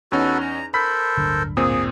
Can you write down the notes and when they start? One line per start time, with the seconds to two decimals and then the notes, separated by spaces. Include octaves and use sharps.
0.12 E2 C#4 D#4 F#4 A4 B4
0.41 A#5
0.74 A4 A#4 C5 B5 B6
1.17 D1 G1 D3
1.57 A#2 C4 G#4 D#6